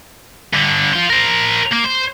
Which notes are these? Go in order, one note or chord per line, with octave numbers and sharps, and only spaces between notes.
G2 D3
F4 C5
A#4 C5
A#3
C5